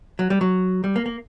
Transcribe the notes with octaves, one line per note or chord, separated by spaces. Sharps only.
F#3
G3
F#3
G3
A#3
A#3